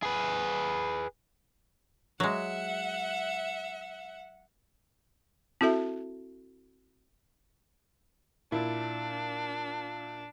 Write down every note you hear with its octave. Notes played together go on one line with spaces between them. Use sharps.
G#4 B4
F#3 G#3 E5 F#5
C4 E4 F#4 A4 E5 A5
A#2 D4 E4